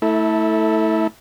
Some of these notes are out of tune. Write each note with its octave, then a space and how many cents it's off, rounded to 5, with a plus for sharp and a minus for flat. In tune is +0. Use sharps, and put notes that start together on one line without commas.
A3 +0 E4 -25 A4 +5